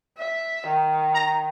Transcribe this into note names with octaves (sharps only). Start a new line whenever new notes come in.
E5
D#3
A#5